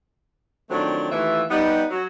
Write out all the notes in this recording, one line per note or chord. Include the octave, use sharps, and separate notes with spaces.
D#3 F3 F#3 A3 C4 D4
D#2 A2 E3 F4 E5
G3 B3 D#4
F#3